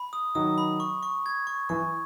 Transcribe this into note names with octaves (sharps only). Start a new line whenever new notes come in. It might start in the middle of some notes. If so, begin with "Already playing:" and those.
Already playing: B5
D#6
D#3 F#3 D#6
B5
C#6
C#6
G#6
C#6
E3 C#6